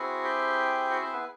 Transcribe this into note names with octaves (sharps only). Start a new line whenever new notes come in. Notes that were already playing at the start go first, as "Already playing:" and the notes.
Already playing: C4 E4 F#4 G#4 F#5
G4 G5
F#4 F#5
C4 C5
B3 B4